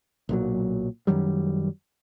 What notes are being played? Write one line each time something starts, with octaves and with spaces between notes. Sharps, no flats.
B1 A#2 F#3
F#2 D#3 F#3 G3